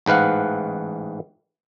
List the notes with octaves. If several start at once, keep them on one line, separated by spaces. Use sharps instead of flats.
A1 G#2 B4 F5 F#5